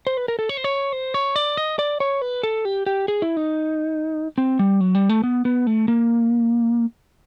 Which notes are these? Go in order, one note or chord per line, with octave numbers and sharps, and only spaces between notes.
C5
B4
A#4
A4
C#5
C5
C#5
C5
C#5
D5
D#5
D5
C#5
B4
A4
G4
G4
G#4
E4
D#4
C4
G3
F#3
G3
A3
B3
B3
A3
A#3